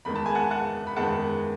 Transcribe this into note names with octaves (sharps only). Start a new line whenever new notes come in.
E2 D#3 G#3 B5
A5
G#5
F#5 A5
F#5 A5
B5
E2 D#3 G#3 F#5 A5